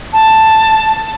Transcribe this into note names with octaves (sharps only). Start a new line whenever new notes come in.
A5